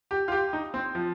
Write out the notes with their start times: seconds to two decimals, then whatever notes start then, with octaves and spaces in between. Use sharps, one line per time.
0.11 G4
0.28 F4
0.32 G4
0.53 D#4
0.74 C4
0.95 F3